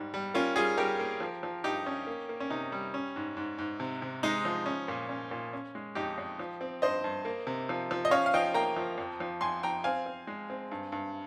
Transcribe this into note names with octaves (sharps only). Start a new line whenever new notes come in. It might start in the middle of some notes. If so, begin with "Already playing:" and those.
Already playing: G#2 G3
G3
A#3 C#4 F4
G3 F4 G#4
G3 G4 A#4
A#3
F3
F3
G2 D#4 G4
C#4
A#3
A#3
C#4
C3 D#4
G3
C#4
G#2
G#2
G#2
C3
C3
G#3 D#4
F3
C#4
A#2
C#4
A#2
C#4
G#3
F2 D#4 G4
F2
F3
C4
G2 C5 D#5
G2
A#3
C3
F3
F3
D#5
C#4 C#5 F5
F5
F3 D#5 G5
A#3 G5 A#5
F3
F2
F3
F2 G#5 C6
F3 G5 A#5
C4 F5 G#5
C4
G#3
C4
G2
G2